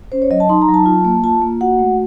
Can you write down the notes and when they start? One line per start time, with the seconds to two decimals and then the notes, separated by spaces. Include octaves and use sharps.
0.12 C#4 C5
0.22 C#5
0.31 F#3 D#5
0.40 A5
0.49 D#4 C6
0.62 A#5
0.68 F#3
0.74 A5
0.86 F4
1.05 A#3
1.24 F4 A5
1.42 A#3
1.61 F#4 F#5
1.79 A3